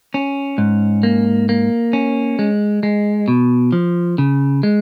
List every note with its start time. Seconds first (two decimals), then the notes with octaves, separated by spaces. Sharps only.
0.14 C#4
0.58 G#2
1.03 A#3
1.49 A#3
1.93 C#4
2.39 G#3
2.83 G#3
3.28 B2
3.72 F3
4.18 C#3
4.63 G#3